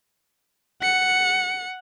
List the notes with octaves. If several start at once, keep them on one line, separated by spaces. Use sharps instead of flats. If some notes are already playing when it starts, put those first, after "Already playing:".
F#5 C#7